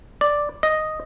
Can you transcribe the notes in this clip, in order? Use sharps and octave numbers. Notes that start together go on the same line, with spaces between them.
D5
D#5